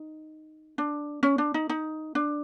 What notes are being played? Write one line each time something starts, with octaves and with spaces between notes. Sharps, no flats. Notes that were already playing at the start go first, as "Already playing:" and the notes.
Already playing: D#4
D4
C#4
D4
D#4
D#4
D4